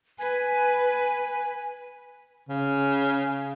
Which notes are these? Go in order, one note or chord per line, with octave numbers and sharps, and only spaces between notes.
B4 G#5
C#3